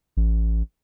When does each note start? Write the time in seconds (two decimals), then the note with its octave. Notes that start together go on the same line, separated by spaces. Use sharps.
0.17 A1